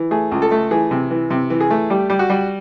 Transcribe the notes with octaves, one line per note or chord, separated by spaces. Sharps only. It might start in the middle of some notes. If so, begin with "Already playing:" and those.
Already playing: E3
A3 G#4
C#2
A4
A3
E3 G#4
C3
E3
C3
E3
G#4
A3
G3 G4
G3
F#4
G3